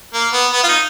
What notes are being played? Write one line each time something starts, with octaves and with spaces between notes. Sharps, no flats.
A#3
B3
B3
F4
D#4